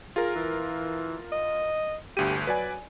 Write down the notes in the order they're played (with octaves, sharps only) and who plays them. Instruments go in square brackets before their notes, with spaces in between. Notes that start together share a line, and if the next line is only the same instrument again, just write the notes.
[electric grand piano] F4 A#4 [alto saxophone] G#4
[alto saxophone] E3
D#5
[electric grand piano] G1 D2 D#7 [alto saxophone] G4
[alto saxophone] F#3 [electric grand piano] B4 D5 G#5